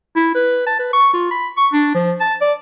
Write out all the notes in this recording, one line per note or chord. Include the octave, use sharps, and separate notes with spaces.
E4
B4
A5
B4
C#6
F4
B5
C#6
D4
F3
A5
D5